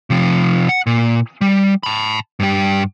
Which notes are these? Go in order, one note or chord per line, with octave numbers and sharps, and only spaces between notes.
C3 F3
F#5
A#2
G3
A5 B5
G2 G4